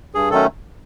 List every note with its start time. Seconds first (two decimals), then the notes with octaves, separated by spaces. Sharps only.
0.15 G2 G#4
0.31 D#3 F#3 A3 C#4 A4